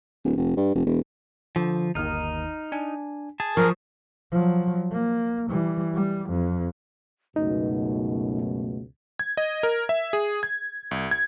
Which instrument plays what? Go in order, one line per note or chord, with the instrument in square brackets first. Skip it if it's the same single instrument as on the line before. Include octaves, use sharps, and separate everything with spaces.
[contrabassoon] D1
F1
G2
F1
E1
[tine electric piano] D3 [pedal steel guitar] F3
[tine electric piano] G1 D#2 D#3 [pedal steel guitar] D#4 F6
[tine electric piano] D4 G#5
[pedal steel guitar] G#4 A5
[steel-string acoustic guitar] F3 [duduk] A#4 [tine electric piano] C#6 D#6
[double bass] F3 F#3
A#3
E3 G3
G3
F2
[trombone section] C#2 F#2 B2 [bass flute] A3 [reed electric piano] D#4
[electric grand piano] G#6
D#5
A#4
E5
G#4
G#6
C2
G#6